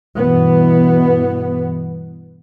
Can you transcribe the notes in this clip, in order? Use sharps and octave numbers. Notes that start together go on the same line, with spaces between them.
G2 B2 E3 B3